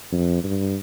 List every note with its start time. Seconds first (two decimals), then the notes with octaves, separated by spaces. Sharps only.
0.13 F2
0.44 G2